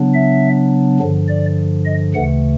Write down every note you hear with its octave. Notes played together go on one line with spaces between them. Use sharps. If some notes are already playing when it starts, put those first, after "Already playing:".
Already playing: C#3 F#3 B3 D4
E5
G2 D3 F3
D5
D#5
D2 C#3 E3 A3 F#5